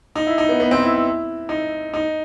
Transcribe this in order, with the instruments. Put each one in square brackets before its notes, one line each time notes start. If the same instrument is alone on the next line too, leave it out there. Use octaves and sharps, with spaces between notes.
[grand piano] D#4
E4
D#4
B3
B3
C4
E4
E4
D#4
D#4